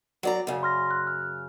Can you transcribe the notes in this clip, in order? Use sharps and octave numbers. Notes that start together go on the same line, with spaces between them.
F#3 D5 A#5
F#2 C#3
C6 F6 A#6
F#6
F6